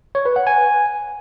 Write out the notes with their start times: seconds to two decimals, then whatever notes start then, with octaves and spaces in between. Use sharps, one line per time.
0.15 C#5
0.25 B4
0.36 F#5
0.47 G#5